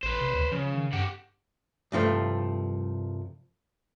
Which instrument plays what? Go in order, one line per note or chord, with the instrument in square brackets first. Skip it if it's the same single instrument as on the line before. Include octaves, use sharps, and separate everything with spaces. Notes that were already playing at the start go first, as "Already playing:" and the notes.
[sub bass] A1 [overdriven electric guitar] B4 C5
[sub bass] C3
D2
[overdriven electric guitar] C#3 [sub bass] F3
[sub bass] D#3
[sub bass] G2 [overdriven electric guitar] G4 F#5
[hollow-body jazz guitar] C2 G2 F3 A3